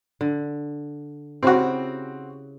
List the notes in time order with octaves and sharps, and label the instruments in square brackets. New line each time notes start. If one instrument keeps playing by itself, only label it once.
[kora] D3
[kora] C#3 E4 G4 [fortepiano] C4 F#4